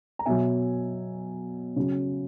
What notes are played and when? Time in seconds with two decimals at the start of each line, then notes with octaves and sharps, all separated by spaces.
0.19 A#5
0.26 B2 F#3 E5 G#5
1.76 C#3 F#3